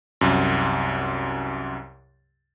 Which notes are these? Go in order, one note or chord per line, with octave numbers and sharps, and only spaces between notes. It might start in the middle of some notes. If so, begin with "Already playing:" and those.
C2 F#2